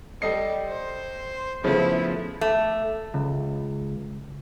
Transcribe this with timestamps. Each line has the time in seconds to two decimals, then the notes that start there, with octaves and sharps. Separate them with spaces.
0.22 G3 A4 D#5 C7
0.68 C5
1.64 C#3 F3 A3 B3 E4 F4
2.41 A3
3.14 C#2